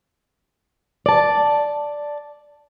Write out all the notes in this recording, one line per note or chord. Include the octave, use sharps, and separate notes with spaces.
D5 A5